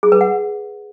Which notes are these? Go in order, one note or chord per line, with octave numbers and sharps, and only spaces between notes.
G#4
B4
F#5